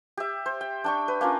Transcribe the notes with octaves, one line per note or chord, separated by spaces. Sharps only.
G4 E5
C5
G5
D4 G5 C#6
B4
A#3 C#4 D4 F4